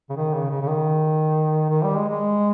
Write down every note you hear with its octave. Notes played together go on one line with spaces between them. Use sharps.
C#3
D#3
C#3
C#3
C#3
D#3
D#3
G3
G#3
G#3